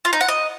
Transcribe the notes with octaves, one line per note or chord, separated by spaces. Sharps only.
F4
D#4
F#5
D#5